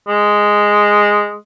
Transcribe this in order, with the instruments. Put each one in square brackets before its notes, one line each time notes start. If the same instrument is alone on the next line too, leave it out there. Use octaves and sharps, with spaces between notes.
[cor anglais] G#3